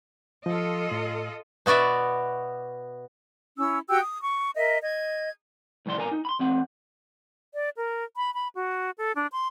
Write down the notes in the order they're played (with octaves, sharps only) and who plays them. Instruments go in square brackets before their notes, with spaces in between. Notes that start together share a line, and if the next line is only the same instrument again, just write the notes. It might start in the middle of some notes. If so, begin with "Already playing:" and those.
[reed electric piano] F3 [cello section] F4 A4 D#5
[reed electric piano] A2
[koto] B2 B3 F#4 D5 E5
[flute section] C#4 E4 E6
F#4 G4 G5 E6
D#6
C#6
A#4 D#5 E5
D#5 G#6
[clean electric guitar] C2 A2 F3 D5 C6
A#2 A#4 G#5 A#5
D#4
B5 C6
E2 C4 F#5
[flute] D5
A#4
B5
B5
F#4
A4
D4
C6